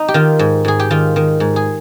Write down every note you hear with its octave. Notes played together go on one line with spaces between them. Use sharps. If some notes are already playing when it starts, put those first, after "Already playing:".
Already playing: D#4
G4
D#3 F4
G#2
G#2 G#4
G4
D#3 F4
D#3
G#2
G#4